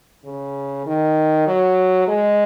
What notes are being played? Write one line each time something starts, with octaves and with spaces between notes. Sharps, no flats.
C#3
D#3
F#3
G#3